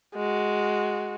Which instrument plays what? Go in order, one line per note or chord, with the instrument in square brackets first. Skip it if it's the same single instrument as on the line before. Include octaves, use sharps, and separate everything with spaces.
[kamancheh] G#3 F#4